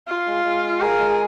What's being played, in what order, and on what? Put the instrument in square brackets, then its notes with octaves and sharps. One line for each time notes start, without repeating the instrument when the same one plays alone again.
[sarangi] F4 [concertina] F5
[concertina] G#3
G#3
F5
[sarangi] G#4 [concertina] A#4
[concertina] G#3